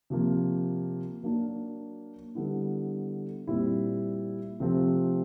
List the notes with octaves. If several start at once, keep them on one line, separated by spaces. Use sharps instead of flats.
C3 F3 A#3
F#3 A#3 D4
D3 G3 B3 E4
A#2 G3 C4 E4
C3 F3 A3 C4 F4